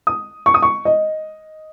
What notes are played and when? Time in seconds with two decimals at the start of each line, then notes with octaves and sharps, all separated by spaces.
0.07 D#6
0.46 C#6
0.54 D#6
0.62 C#6
0.85 D#5